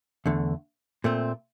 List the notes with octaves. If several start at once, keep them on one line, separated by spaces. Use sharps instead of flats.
E2 D3 A3
A#2 A3 C4